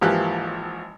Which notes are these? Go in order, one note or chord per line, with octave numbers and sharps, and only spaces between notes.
G#1 E3 F3 A#3 G4 F#6